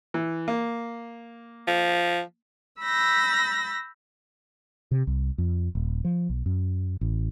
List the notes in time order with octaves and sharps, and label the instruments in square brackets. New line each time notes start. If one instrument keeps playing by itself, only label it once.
[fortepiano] E3
A#3
[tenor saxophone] F3
[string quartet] B5 E6 G6 A#6
[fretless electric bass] C3
C2
F2
D#1
F3
B1
F#2
A1